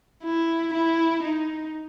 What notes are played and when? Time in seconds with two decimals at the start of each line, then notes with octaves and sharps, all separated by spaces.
0.24 E4
0.74 E4
1.23 D#4